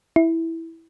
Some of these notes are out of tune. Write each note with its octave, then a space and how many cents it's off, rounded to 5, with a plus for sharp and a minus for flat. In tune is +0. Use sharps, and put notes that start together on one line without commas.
E4 -5